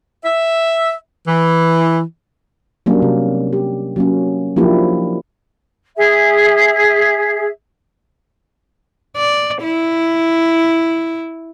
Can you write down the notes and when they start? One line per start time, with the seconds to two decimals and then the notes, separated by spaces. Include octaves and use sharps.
0.25 E5
1.27 E3
2.86 F#3 G3 A#3 C#4 D4
3.02 C3
3.53 G4
3.96 F#3 A#3 C#4
4.56 F3 F#3 A#3 D4 E4 G4
5.96 G#4 E5
9.16 D5
9.63 E4